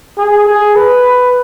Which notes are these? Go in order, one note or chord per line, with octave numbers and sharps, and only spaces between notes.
G#4
G#4
B4